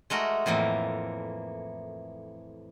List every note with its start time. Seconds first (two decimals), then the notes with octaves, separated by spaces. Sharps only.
0.10 G#3 A3 F#4 A#4
0.46 F2 A2 E3 A#3